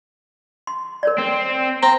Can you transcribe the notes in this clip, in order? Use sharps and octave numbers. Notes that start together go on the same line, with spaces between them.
C6
A#4 C#5 D5
C4
C4 A#5